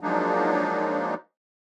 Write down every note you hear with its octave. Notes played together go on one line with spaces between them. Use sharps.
F3 F#3 G#3 A#3 D4 D#4